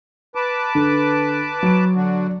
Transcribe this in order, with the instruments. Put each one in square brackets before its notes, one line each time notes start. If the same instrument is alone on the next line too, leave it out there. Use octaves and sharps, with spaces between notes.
[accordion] B4 A5 D6
[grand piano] D3
F#3 D7
[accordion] D3 D4 F#4